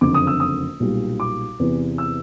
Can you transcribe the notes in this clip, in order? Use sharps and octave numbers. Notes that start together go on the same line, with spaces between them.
F#1 F2 D3 D6
D#6
E6
D#6
B1 A#2 G3
D6
E2 C3 E3
E6